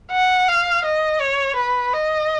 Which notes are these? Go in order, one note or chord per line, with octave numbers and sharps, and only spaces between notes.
F#5
F5
D#5
C#5
B4
D#5